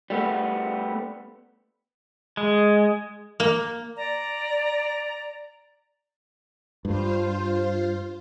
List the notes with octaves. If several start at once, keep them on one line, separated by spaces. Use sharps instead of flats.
G3 A3 B3
G#3
A#3
D5 A#5
G2 F4 C5